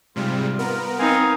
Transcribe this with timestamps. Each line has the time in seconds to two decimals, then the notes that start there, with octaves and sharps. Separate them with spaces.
0.16 G#2 C3 G3 F4
0.59 B3 A#4
0.99 C4 D#4 F5 G#5